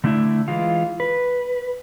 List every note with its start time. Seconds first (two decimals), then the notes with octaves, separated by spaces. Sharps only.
0.04 D3 A3 D4 E4 E5
0.48 E3 G#3 F4
1.00 B4